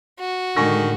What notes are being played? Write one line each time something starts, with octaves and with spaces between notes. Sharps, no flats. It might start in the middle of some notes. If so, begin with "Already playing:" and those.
F#4
A2 D3 D#3 G#3 G#5 C#6 A#6